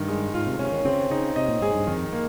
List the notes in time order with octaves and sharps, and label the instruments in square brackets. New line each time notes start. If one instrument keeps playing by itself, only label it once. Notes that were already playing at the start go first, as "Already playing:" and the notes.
Already playing: [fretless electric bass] G2 [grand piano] D#3
[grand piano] G#3
[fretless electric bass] G#2 [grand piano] F4
[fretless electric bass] C3
[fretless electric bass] C3 [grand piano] C#4
[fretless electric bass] D#3
[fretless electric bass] C#3 [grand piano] C4
[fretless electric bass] C#3 [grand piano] D#4
[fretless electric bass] C3 [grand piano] D#5
[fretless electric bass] A#2
[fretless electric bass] G#2 [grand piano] G#4
[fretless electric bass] G2
[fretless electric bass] F2 [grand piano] D#3
[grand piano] A#3